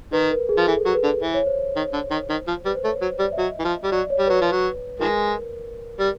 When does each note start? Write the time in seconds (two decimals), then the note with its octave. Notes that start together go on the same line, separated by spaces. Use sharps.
0.13 D#3 B4
0.31 A#4
0.49 G#4
0.57 F3
0.67 E3 A4
0.86 F#3
0.95 B4
1.03 D3
1.22 E3 C5
1.34 C#5
1.47 C5
1.76 D#3
1.93 D3
2.11 D#3
2.30 D#3 C5
2.48 F3
2.65 G3 B4
2.75 C5
2.83 A3 C#5
3.01 F#3 C5
3.19 G3 D5
3.32 E5
3.37 F#3 D#5
3.59 E3
3.64 F3
3.84 G3
3.92 F#3 D5
4.10 C#5
4.19 G3
4.27 F#3 B4
4.41 F3
4.52 F#3
5.00 D#3 F3 G#3 A#4
6.00 G3